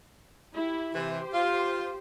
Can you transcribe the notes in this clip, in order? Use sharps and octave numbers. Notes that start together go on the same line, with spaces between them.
E4 G4
C3 E3 G4 C5
F4